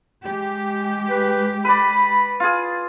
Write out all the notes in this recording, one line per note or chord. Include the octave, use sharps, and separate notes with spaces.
G#3 G4
B4
B4 D5 B5
F4 G#4